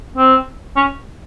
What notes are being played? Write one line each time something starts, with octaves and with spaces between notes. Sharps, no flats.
C4
C#4